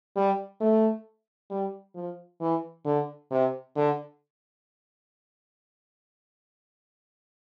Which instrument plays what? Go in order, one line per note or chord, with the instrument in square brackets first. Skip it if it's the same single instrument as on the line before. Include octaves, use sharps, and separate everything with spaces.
[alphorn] G3
A3
G3
F3
E3
D3
C3
D3